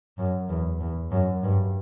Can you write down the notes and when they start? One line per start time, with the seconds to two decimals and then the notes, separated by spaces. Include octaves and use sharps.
0.18 F#2
0.49 E2
0.80 E2
1.12 F#2
1.43 G2